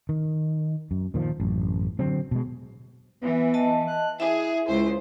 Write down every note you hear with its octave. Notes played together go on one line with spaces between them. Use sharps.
D#3
F#2
A#2 D#3 F3
A1 F#2
D3 F#3 C4
B2 G#3
E3 B3
D#5 A5
F#6
E4 G#4 E5
C#2 E4 C5